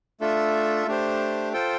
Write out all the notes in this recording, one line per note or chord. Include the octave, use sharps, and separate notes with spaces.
A3 D4 F4 A4 E5
A3 D4 G4 C5
F4 A4 C5 G5